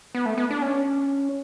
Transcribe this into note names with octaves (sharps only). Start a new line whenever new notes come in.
B3
A3
B3
D4
C#4